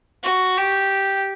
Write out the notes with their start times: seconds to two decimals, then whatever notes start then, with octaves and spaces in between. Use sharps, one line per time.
0.24 F#4
0.57 G4